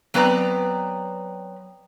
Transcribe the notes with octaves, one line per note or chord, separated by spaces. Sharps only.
F#3 B3 C4 B4 D5 A#5